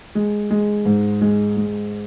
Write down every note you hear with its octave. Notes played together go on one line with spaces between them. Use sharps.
G#3
G#3
G#2
G#3
G#3